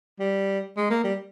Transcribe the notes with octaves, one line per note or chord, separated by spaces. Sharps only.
G3
G#3
A#3
G3